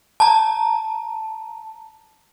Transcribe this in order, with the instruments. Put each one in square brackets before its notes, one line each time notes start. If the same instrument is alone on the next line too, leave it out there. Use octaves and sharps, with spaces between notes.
[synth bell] A5 A#5